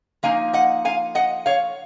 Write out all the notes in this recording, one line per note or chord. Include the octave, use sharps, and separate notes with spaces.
F3 A#3 D#4 F5 G#5
D#5 F#5
F5 G#5
D#5 F#5
C#5 F5